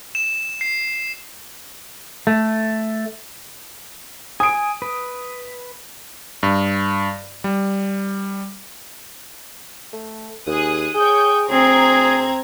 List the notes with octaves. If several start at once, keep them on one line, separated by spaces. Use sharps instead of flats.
E7
C7
A3
G#5 D#6 D7
B4
G2
G3
A3
D#2 G#4 D#6 F#6
G#4 C#5 G5 D#6 G6
D2 C4 G#4 A#5 G#6